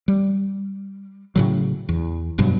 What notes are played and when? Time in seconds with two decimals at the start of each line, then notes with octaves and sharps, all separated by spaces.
0.08 G3
1.36 A2 C#3 F#3
1.89 E2
2.38 F1 G2 B2 F#3